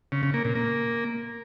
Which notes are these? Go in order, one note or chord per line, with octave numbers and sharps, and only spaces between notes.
C#3
C#3
A#3
A#2
A#3